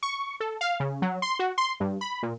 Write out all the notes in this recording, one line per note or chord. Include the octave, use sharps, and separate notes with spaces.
C#6
A4
F5
C#3
F#3
C6
F#4
C6
G2
B5
A#2